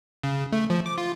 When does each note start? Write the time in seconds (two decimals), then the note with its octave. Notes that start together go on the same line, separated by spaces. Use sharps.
0.24 C#3
0.52 A3
0.70 F3
0.86 D6
0.98 F4